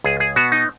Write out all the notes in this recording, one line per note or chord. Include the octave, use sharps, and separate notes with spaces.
C#2 G#4
G#4
B2 B3 F#4
D#4